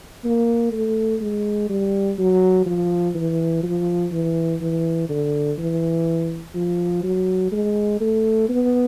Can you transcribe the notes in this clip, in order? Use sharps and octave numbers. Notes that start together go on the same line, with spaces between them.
A#3
A3
G#3
G3
F#3
F3
E3
F3
E3
E3
D3
E3
F3
F#3
G#3
A3
B3